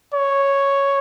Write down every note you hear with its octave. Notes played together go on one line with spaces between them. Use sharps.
C#5